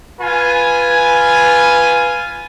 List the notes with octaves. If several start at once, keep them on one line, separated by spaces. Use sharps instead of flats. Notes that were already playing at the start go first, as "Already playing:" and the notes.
F4 B4 G#5